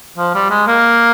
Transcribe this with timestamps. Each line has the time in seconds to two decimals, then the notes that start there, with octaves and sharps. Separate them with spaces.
0.17 F3
0.35 G3
0.50 G#3
0.67 A#3